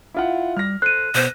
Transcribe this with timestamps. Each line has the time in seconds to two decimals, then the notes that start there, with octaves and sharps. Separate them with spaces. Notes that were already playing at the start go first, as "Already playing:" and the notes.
0.14 E4 F4 F#5
0.57 G3 F6 A#6
0.82 A4 C5 F#6 D#7
1.15 B2 B3 C5